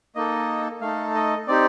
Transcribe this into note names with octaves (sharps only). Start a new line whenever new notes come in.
A#3 D#4 A4 D#5
A3 D#4 A4 F5
D#5
C4 D#4 G4 D5